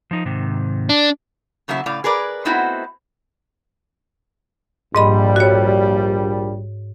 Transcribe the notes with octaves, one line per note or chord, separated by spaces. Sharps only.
F3 D#4
G#2 C3 D#3
D4
A2 C#3 F#3 A#3 E5
A2 C#3 D5 F5
G#4 A#4 B4 D5
A3 B3 C4 D#4 E4 F#4
A#1 G#2 G3 D#5 B5
F#4 C#5